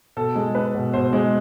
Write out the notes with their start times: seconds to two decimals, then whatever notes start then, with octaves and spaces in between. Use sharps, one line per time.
0.17 B2 A4
0.35 G#3
0.55 G#3 B4
0.75 B2
0.93 B2 C5
1.13 G#3